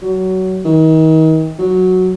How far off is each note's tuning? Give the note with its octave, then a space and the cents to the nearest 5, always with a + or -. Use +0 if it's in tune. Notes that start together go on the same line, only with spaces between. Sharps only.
F#3 +20
D#3 +35
F#3 -5